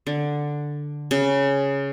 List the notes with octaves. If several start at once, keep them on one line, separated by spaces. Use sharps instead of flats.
D3
C#3